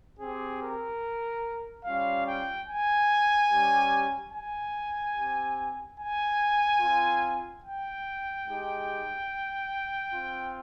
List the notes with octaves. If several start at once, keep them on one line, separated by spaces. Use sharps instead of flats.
C4 G4 G#4
A#4
G3 C#4 F4 F5
G5
G#5
G3 C#4 G4
G#5
C4 G4
G#5
C4 F4
G5
G#3 D#4 G4
C4 F4